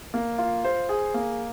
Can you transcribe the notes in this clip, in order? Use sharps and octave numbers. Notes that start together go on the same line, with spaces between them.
A#3
F4
C5
G#4
A#3